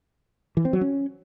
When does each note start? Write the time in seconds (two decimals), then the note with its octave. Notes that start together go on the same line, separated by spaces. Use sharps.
0.57 E3
0.65 C4
0.73 F#3
0.81 C#4